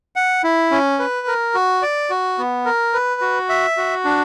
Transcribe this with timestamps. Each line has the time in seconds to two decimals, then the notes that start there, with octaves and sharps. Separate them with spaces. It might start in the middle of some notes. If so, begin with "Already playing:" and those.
0.16 F#5
0.44 E4
0.71 C#4
0.99 B4
1.27 A#4
1.55 F#4
1.82 D5
2.10 F#4
2.38 B3
2.65 A#4
2.93 B4
3.21 F#4
3.49 E5
3.77 F#4
4.05 D4